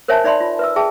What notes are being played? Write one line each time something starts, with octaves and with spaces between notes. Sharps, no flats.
A#4 C5 C#5 E5 G#5 A5
D#4 D5 E5 B5 C6
F4
B4 E5 E6
G#4 E5 G5 A5